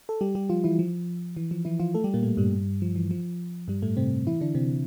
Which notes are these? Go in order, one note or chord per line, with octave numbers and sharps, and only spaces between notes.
A4
G3 G4
G3 G4
F3 F4
E3 E4
F3
E3
F3
E3 E4
F3 F4
A3 A4
G3 G4
A#2 A#3
A2 A3
G2 G3
F3
E3
F3
G2 G3
A2 A3
C3 C4
E3 E4
D3 D4
C3 C4